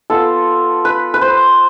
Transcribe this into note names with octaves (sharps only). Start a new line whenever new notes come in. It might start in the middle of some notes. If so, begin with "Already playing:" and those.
B3 F4 A4
B4
B4
C5